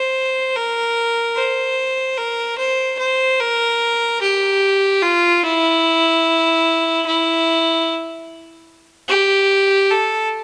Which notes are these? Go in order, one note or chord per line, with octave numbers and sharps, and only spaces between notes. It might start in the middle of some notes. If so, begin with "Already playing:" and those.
Already playing: C5
A#4
C5
A#4
C5
C5
A#4
G4
F4
E4
E4
G4
A4